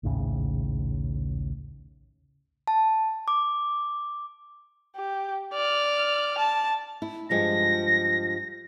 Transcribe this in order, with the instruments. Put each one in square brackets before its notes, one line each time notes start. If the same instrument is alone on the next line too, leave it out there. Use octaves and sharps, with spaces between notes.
[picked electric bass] A#1 D#2 A2 C#3
[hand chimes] A5
D6
[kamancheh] G4
D5 F6
A5
[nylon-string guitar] E4
[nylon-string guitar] G2 F3 G#3 [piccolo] A#6